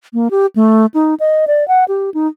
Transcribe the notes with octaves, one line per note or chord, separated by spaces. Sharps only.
A#3
G4
A3
D#4
D#5
D5
F#5
G4
D#4